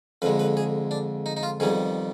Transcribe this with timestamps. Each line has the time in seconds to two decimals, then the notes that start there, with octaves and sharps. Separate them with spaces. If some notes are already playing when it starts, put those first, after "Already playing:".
0.22 F2 D3 G#3 B4
0.39 B4
0.57 G#4
0.91 D4
1.26 D#4
1.37 D#4
1.43 F4
1.60 F2 D#3 G3 B3 G#4